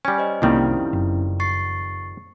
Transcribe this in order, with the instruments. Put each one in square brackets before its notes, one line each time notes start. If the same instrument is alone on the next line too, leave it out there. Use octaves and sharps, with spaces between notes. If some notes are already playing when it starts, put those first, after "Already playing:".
[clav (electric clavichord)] G3 C#4 [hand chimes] G#5
[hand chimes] C5 C#5 D#5
[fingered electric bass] C2 A#3 [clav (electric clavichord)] F2 D#3 G3 [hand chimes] C4 C#4 E4
[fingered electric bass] F#1
[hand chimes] C#6 A6 C7